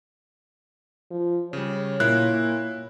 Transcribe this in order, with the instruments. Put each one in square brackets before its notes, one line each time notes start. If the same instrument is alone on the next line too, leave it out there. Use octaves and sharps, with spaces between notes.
[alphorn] F3
[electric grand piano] C#3 G3 [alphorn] C#5
[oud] A#2 [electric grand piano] E4 [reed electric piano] F#6